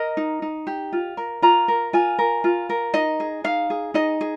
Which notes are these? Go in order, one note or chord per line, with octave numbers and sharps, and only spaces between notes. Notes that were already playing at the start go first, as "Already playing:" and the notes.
Already playing: A#4 D#5
D#4
D#4
G4
F4
A#4
F4 A#5
A#4
F4 G#5
A#4
F4
A#4
D#4 D#5
G#4
D#4 F5
G#4
D#4 D#5
G#4